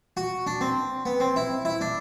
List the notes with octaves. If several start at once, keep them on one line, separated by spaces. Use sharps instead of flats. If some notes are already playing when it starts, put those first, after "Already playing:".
F#4
D4
C4
B3
C4
E4
E4
D4